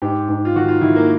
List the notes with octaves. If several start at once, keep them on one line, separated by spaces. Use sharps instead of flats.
G#2 G4
G#2
F4
D#3 F#4
F4
D#3 E4
A#3